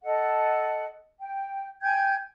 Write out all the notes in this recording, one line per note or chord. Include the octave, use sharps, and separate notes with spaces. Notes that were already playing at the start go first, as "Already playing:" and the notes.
A4 D#5 F#5
G5
G5 G#5 G6 G#6